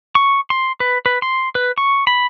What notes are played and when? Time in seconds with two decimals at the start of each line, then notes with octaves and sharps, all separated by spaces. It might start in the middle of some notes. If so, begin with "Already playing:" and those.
0.15 C#6
0.50 C6
0.80 B4
1.06 B4
1.22 C6
1.55 B4
1.78 C#6
2.07 B5